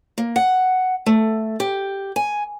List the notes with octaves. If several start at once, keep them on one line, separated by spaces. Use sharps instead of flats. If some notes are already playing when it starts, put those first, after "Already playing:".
A#3
F#5
A3
G4
G#5